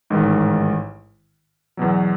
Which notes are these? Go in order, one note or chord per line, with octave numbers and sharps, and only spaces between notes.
A1 G#2 D#3
E2 B2 F#3